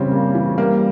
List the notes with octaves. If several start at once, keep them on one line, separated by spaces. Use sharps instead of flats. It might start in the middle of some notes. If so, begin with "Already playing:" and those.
Already playing: C#3 E3 G3 C4 C#4
A#3
E3
G3 A#3